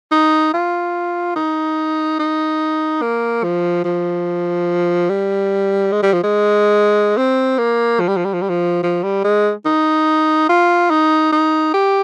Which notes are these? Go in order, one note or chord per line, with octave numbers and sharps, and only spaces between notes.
D#4
F4
D#4
D#4
A#3
F3
F3
G3
G#3
G3
F3
G#3
C4
A#3
F3
G3
F3
G3
F3
G3
F3
F3
G3
G#3
D#4
F4
D#4
D#4
G4